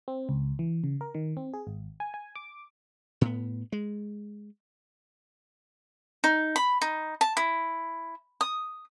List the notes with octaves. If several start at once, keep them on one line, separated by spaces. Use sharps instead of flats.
C4
C#2
E3
C#3
A#4
D#3
C4
G#4
G#1
G#5
G#5
D6
A2 B3
G#3
D#4
B5
D#4
A5
E4
D#6